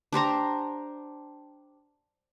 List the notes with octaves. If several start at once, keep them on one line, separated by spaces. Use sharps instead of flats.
D4 G4 C5 A#5